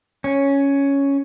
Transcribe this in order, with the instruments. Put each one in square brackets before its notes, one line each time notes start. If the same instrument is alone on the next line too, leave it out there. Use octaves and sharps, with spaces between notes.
[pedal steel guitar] C#4